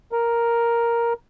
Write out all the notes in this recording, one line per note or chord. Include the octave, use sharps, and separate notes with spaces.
A#4